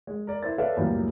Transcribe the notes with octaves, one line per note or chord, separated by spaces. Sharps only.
G#3
A#4 D5
E4 C5 A6
A4 B4 C#5 D5 E5 F5
C#2 F#2 A2 G3 A#3